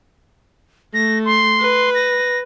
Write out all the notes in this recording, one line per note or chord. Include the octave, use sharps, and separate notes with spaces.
A3 A#6
C6
B4
A#6